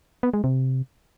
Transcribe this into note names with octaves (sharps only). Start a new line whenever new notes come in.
B3
G#3
C3